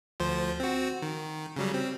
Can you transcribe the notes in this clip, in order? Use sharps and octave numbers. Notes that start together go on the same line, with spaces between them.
D2 F3 C5
C4 F#4
D#3
C#3 F#3 G3
C4